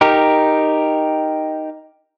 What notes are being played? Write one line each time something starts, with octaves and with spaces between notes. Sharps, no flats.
D#4 G4 A#4